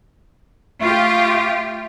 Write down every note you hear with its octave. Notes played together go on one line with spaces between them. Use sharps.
A3 F4 G4